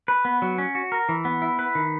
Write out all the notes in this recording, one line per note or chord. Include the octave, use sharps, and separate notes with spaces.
B4
B3
F#3
C#4
F#4
A#4
E3
B3
E4
B4
D#3